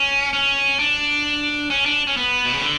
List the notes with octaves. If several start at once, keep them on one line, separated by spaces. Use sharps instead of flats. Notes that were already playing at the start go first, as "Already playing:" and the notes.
Already playing: C#4
C#4
D4
C#4
D4
C#4
B3
B2
C#3
D3